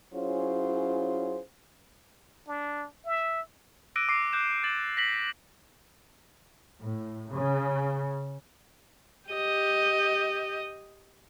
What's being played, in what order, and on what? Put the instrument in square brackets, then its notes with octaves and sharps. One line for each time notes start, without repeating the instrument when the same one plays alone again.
[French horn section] F#3 C#4 E4 F4 G#4 C5
[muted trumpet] D4
E5
[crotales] D6 E6 F#6 A#6 D7 D#7
D6 C7
D6 F#6 G6 E7
D6 A6 E7 F#7
A#6 B6 F#7
[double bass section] A2
C#3
[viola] G4 D#5